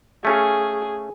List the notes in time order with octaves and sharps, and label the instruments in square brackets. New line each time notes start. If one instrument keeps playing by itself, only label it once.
[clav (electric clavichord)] A3 C#4 F5 [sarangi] G#4